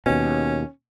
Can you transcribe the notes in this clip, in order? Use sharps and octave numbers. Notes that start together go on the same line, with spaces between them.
D#2 B2 C#4